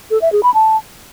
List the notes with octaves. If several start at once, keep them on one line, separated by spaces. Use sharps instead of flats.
A4
E5
G#4
B5
A5